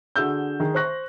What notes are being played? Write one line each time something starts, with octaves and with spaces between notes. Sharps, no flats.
D3 F#4 G#4 E6 G6
D#3 G#4
C5 C#6 F#6 A#6